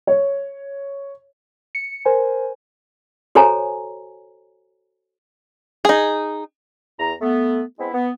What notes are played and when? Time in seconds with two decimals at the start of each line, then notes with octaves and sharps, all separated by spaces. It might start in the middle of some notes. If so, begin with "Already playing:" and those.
0.07 C#5
1.75 C#7
2.05 A#4 C5 G#5
3.35 F#4 A4 C5 C#5 G#5 A#5
5.85 D#4 G#4
7.00 E2 A#5
7.21 A3 B3
7.79 G#3 B3 C4 E4
7.94 B3